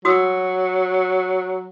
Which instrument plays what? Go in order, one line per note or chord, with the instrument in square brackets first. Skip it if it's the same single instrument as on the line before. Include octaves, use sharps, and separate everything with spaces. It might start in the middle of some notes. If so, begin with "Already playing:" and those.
[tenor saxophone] F#3 [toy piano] F#4 D#6 E6